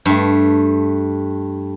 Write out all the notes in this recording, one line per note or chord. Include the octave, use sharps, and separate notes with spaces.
G2 A3